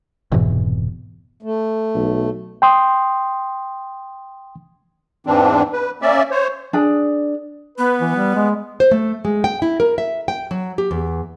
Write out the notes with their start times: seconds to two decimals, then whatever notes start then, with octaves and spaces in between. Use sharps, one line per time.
0.32 F1 G#2 B2 E3
1.43 A3
1.95 B1
2.62 G5 C6 D#6
5.27 E2 G#2 E3 C4 D4
5.73 B4
6.02 A#3 C#4 D5 E5
6.31 C5 C#5
6.73 D4 G#4
7.78 B3 B4
8.01 E3
8.16 G3
8.35 G#3
8.80 C5
8.91 A3
9.25 G#3
9.44 G5
9.62 E4
9.80 A#4
9.98 E5
10.28 G5
10.51 F#3
10.78 G4
10.91 E2